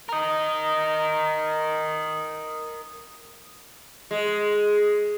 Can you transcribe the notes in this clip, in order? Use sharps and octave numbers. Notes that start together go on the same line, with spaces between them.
A#4 D#5
G#3